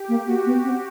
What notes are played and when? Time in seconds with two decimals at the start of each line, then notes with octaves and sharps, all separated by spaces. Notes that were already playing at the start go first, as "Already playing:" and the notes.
Already playing: G4
0.09 A#3
0.27 A#3 F#4
0.46 B3
0.64 C4